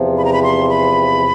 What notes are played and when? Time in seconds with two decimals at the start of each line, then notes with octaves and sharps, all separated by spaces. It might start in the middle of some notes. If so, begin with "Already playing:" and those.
Already playing: E2 C3 F3
0.17 B5
0.25 A#5
0.33 B5
0.43 C6
0.68 B5